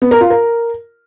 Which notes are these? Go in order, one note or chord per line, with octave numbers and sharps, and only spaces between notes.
B3
A#4
F4
A#4